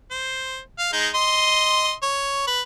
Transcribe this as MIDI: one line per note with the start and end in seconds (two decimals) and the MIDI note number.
0.11 0.59 72
0.79 0.89 77
0.93 1.09 56
0.93 1.09 63
1.14 1.92 75
1.14 1.92 84
2.03 2.46 73
2.47 2.61 71